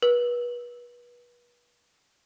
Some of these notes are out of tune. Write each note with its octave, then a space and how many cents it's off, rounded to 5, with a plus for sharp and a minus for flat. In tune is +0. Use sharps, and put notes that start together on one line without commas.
B4 -35